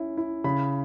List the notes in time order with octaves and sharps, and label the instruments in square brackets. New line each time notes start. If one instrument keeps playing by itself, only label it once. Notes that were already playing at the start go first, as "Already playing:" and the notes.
Already playing: [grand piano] C#4 E4
E4
C#3 B5